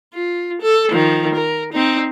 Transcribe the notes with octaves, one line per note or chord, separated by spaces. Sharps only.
F4
A4
D#3 F3
A#4
C4 D#4